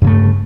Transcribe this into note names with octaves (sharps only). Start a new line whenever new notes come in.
G2 C#3 A3